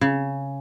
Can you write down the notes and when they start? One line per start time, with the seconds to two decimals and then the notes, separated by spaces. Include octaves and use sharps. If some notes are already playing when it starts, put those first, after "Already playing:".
0.01 C#3